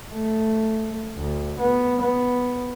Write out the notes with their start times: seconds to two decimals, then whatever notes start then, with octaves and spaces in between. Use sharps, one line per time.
0.12 A3
1.17 D2
1.59 B3
2.02 B3